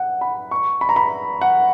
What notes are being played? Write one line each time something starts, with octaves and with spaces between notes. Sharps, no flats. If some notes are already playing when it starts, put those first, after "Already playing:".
Already playing: F#5
B5
C#6
B5
A#5
B5
F#5